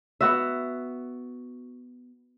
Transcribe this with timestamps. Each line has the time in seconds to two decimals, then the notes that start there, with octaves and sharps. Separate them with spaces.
0.21 B3 F#4 E5